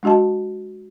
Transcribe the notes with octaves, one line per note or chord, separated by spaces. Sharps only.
G#3 D4 F#4 D#5 A5